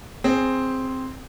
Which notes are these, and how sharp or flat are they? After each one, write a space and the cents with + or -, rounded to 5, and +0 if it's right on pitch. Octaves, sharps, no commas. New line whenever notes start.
C4 +0 G#4 +0 C5 +0